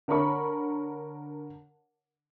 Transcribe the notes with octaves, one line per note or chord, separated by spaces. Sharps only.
D3 A#4 C#5 B5 C#6